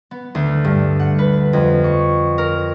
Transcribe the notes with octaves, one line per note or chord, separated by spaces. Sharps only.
B3
D2
G2
F#5
B4
F2
C#6
A#4